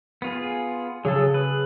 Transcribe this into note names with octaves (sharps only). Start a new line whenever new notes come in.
B3 F4 G#4
C#3 F#3 G#4 A4
B4